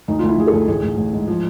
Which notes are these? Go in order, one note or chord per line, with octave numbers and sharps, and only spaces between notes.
D2 D#4
F4
D2
E4
D2 G#4
A4
D2
A1 G#4
A1
A1
G#2
F3